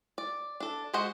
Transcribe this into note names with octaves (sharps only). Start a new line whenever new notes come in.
D5
D4 A4
G#3 F#4 C5 D#5 F#5